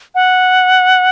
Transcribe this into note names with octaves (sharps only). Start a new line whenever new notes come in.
F#5